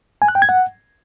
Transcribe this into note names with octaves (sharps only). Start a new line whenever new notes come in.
G#5
F#6
G5
G#6
F#5